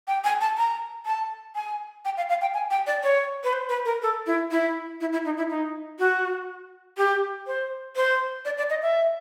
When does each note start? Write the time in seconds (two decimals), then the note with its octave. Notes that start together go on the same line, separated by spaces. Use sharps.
0.08 G5
0.24 G#5
0.41 A5
0.57 A#5
1.06 A5
1.55 G#5
2.05 G5
2.17 F5
2.29 F5
2.41 G5
2.54 G#5
2.71 G5
2.87 D5
3.03 C#5
3.44 B4
3.53 C5
3.69 B4
3.85 A#4
4.02 A4
4.27 E4
4.51 E4
5.01 E4
5.13 E4
5.25 D#4
5.37 E4
5.50 D#4
5.99 F#4
6.97 G4
7.47 C5
7.96 C5
8.45 D5
8.58 D5
8.70 D#5
8.82 E5